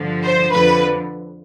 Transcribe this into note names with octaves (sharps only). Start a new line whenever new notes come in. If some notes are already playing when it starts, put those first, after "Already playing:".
Already playing: G2 D3 F3
C5
F2 D3 F3 B4